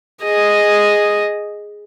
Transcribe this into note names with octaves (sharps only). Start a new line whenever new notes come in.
G#4 D#5